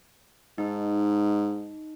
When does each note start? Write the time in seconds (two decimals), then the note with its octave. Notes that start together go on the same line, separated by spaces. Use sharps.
0.58 G#2 D#4